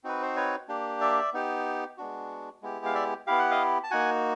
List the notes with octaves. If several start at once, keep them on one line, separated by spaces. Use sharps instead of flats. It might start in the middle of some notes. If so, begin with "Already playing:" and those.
C4 D#4 F#4 B4
C5
B4 C#5
A#3 D4 G4
D5 E5
B3 D#4 G4
G#3 B3 D4 F#4
G#3 B3 E4 G4
F5
D5 E5
B3 E4 G4 F5
F#5
D#5 F5
A5
A#3 D#4 F#4 F#5 G#5